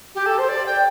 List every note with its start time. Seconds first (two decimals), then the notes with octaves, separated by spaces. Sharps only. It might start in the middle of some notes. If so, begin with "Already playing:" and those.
0.15 G4
0.26 A4
0.38 C5
0.49 D5
0.66 G5